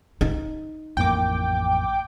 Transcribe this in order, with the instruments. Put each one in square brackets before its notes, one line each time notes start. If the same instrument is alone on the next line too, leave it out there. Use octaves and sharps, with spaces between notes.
[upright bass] D#4
[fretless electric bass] A1 F2 A#3 [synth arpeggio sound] G5 D6